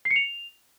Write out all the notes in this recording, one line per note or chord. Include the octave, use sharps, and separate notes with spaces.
C7
C#7
F7